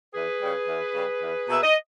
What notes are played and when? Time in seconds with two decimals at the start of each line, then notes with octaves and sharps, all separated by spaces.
0.14 E2 G#4 B4
0.41 C#3 G3
0.68 E2
0.95 C#3 G3
1.21 E2
1.49 B2 A#3 E5
1.62 D#5